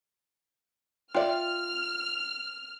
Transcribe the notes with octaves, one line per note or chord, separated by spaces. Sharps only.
F4 D5 E5 G5 F6